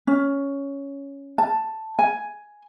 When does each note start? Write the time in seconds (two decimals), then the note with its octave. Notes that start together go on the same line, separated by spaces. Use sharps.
0.07 C#4
1.38 A5
1.99 G#5